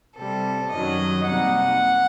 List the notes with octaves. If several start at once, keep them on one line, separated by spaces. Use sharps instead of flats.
C3 G3 C4 A4
F#2 D#3 F#3 D#5
C3 G3 A#3 D#4 F#5